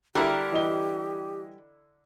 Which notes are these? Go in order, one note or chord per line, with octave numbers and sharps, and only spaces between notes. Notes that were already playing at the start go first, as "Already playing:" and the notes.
D3 G3 E4 G4 A#4 A#5
E3 D#5 G7